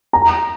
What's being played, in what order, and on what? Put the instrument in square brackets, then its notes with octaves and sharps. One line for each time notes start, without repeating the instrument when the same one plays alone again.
[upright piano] A#5